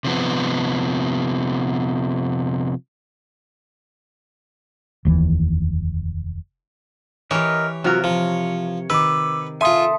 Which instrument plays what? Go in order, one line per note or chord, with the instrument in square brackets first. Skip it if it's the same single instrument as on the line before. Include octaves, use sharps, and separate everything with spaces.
[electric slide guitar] C3 F3 B3
[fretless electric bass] F1 D#2 E3
[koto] E3 G4 [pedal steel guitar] A#4 D#5 [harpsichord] C#5
[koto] C3 A#4 [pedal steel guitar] F#3 F4 F#4
[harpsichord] F3 [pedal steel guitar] C#5
[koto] D#3 [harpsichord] B4 [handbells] D6 E6
[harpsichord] F4 G#5 [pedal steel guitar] A4 [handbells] E5 C6 D#6